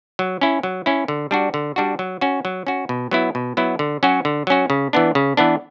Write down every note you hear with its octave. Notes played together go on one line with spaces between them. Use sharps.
F#3
C#4 E4
F#3
C#4 E4
D3
G3 D4 F#4
D3
G3 D4 F#4
F#3
C#4 F#4
F#3
C#4 F#4
B2
F#3 B3 E4
B2
F#3 B3 E4
D3
F#3 C#4 F#4
D3
F#3 C#4 F#4
C#3
E3 B3 D4
C#3
E3 B3 D4